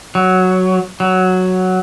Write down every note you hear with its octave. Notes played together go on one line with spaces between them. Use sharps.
F#3
F#3